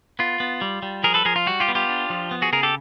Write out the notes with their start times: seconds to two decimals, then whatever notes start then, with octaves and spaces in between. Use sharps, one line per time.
0.19 B3 F4
0.40 B3
0.61 G3
0.83 G3
1.04 F3 G#4 A#4
1.14 A4 B4
1.25 F3 G#4 A#4
1.36 F4
1.46 G3 F#4
1.60 F4 G4
1.68 B3
1.75 F4 G4
1.89 D4
2.10 F3
2.31 B3
2.42 F#4 G#4
2.52 C#3 G#4 A#4
2.63 G4 A4